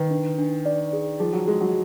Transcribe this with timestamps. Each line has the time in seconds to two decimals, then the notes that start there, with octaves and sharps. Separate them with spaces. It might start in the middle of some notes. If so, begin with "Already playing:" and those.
Already playing: D#3 B4
0.11 D4
0.38 D4
0.66 D5
0.93 G#4
1.20 F3 G#4
1.33 F#3
1.47 G#3 G#4
1.61 F#3